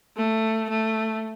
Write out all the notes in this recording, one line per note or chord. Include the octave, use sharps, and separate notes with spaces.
A3
A3